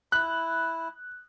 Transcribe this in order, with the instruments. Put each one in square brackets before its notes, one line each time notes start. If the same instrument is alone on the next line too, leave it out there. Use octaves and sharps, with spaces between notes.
[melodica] E4 [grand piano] F#6